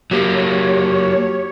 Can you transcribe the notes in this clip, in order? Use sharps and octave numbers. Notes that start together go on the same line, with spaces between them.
F#3 A#3 G4 C#5